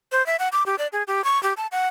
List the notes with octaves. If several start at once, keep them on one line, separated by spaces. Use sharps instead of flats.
C5
E5
F#5
D6
G4
D5
G#4
G4
C#6
G4
A5
F#5